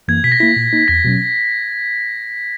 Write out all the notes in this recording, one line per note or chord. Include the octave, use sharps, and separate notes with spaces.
F#2 E3 A#3 G#6
B2 B6
A#6
A#3 E4 B6
A#2
A#3 D#4
E2 A#6
B2 F#3 C#4